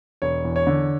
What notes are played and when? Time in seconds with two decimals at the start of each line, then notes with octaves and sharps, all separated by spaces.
0.22 E1 C#5
0.45 E2
0.56 C#5
0.67 D3